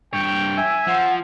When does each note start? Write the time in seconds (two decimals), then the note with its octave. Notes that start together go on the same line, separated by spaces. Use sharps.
0.13 G2 C#5 G5
0.57 E5 G#5
0.87 F3 C5 F#5